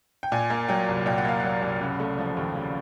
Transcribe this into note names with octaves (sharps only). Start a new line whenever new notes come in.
G5
A#2 G#5
A#3
F#3 G5
C2
A#2 G5
F#5
A#3 F5
F#3 F#5
C2
C#3
A3
F3
D#2
C#3